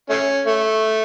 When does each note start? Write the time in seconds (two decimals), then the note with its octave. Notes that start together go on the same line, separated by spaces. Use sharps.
0.10 A3 C#4
0.46 A3